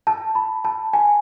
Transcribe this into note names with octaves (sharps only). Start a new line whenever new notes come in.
A5
B5
A5
G#5